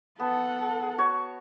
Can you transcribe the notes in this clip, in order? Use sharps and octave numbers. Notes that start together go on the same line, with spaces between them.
B3 A4 F#5 A5
F#4 C#5 C#6